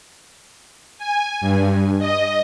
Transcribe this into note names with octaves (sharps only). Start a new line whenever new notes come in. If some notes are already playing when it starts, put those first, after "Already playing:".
G#5
G2
D#5